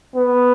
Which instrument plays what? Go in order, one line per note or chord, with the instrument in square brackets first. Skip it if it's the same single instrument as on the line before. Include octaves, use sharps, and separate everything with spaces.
[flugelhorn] B3